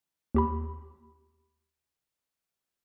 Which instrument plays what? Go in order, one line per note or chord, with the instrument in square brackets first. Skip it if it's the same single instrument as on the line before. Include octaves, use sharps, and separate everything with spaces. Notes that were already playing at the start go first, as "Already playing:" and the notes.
[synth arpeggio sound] D#2 G4 B5